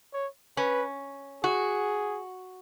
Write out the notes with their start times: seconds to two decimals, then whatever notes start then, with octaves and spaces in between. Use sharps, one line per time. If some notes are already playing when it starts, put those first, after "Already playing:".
0.14 C#5
0.57 C#4 B4
1.43 F#4 G#4